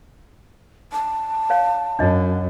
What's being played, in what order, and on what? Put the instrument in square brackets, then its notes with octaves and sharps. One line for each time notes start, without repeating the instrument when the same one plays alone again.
[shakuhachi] A5
[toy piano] C#5 F5
[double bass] F#2 [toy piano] D4 D#5